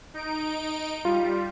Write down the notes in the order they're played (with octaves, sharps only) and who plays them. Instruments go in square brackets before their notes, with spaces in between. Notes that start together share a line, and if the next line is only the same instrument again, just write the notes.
[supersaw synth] D#4 D7
[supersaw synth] G3 [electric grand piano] F4